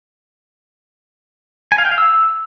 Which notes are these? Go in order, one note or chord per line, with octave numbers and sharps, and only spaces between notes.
G#5
F5
G5
F5
E6